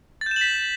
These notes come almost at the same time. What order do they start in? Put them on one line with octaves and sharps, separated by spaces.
A6 G6 E7 F#7 B6